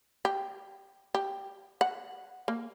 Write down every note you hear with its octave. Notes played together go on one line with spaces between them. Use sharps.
G4
G4
F#5
A#3